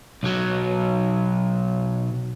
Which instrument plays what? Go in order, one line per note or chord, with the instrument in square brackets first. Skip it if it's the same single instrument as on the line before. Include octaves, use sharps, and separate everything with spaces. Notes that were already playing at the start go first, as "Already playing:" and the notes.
[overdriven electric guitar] B1 F#3